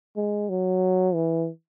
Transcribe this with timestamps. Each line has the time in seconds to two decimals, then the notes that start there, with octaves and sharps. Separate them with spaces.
0.16 G#3
0.50 F#3
1.15 E3